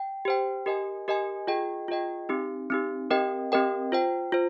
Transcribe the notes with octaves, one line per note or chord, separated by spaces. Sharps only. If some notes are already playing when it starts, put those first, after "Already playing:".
Already playing: G5
G4 C5 G5
G4 A#4 D#5 G#5
G4 A#4 D#5 G#5
F4 G#4 D#5 G5
F4 G#4 D#5 G5
C4 D#4 G4
C4 D#4 G4
C4 G4 A#4 D#5 G5
C4 G4 A#4 D#5 G5
F4 C5 G5
F4 C5